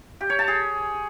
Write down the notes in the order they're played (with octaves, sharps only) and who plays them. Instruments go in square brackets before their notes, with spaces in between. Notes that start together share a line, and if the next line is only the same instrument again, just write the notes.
[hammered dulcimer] G4
C#5
A5
G#4